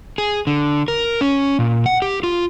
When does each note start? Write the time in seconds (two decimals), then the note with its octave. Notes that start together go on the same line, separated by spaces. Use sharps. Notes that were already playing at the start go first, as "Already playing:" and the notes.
0.18 G#4
0.47 D3
0.88 A#4
1.21 C#4
1.59 A#2
1.86 F#5
2.02 G4
2.23 F4